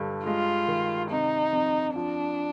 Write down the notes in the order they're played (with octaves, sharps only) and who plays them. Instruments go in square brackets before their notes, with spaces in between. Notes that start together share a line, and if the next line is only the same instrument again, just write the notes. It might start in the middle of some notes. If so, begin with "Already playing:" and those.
Already playing: [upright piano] G2 D3
[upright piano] G#3 [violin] F4
[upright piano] D#3
[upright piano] C3 [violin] D#4
[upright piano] F2
[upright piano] F3 [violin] D4